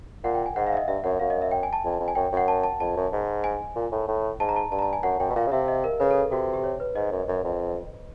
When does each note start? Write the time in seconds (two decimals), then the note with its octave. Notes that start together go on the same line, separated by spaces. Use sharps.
0.24 A#2 F#5
0.35 G5
0.46 G#5
0.56 G#2 F#5
0.67 F5
0.73 E5
0.77 D#5
0.87 G2 E5
1.04 F#2 F#5
1.20 F#2 F5
1.30 D#5
1.42 E5
1.51 G5
1.63 G#5
1.73 A5
1.85 F2
2.00 F2
2.08 G#5
2.15 F#2 G5
2.32 F#2
2.37 F#5
2.48 A5
2.64 A5
2.80 F2 A5
2.96 F#2
3.12 G#2
3.44 G#5
3.76 A#2
3.92 A2
4.08 A2
4.40 G#2 A5
4.49 A#5
4.56 A5
4.71 G2 A5
4.79 A#5
4.82 A5
4.93 G#5
5.03 F#2 F#5
5.19 F#2 G5
5.30 B2
5.35 A#2 F5
5.47 C#3
5.52 C3 E5
5.68 D#5
5.84 A#4
6.00 C#3 B4
6.11 A4
6.21 A4
6.31 C3 F#4
6.54 G4
6.64 C#5
6.80 B4
6.95 G#2 D#5
7.11 F#2
7.28 F#2
7.44 F2